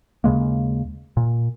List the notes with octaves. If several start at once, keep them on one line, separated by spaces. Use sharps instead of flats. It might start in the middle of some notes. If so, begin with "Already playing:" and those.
D#2 C#3 G#3 A#3
A#2